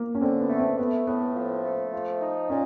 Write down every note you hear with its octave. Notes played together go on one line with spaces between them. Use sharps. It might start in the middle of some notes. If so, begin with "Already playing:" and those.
Already playing: A#3
C#4
D3 C4
B3
A3
C4
A3 B3
A2 B3
F3
A3
F3
D#4
A#2 C#4